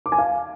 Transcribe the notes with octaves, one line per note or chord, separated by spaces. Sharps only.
D6
G#5
F5